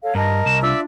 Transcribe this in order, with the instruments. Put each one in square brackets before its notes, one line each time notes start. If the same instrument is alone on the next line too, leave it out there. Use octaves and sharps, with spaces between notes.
[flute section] A4 C#5 F5
[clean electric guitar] G2 [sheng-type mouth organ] A#4 [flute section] D#5 A5
[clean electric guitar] C2 [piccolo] E7
[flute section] D4 F4 [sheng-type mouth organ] D5 E5 [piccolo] E6